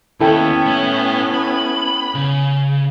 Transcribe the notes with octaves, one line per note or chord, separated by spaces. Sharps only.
D#2 B3 C#4 E4 A4 G5
A3 C#5
B5
C#3